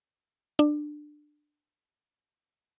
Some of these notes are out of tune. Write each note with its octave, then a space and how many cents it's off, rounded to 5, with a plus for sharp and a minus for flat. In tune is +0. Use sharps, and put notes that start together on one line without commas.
D4 +20